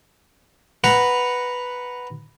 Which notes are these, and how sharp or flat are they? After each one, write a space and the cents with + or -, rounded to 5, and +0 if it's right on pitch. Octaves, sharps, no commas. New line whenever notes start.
B4 +0 F#5 +0 A#5 +0